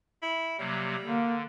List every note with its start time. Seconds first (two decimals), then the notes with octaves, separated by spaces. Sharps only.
0.23 E4
0.59 C3 F#3 G3 A#3
1.05 D3 A#3